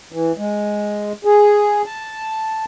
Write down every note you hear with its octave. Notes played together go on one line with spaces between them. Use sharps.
E3
G#3
G#4
A5